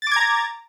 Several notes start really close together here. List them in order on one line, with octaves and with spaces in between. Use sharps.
A6 D6 G#6 A#5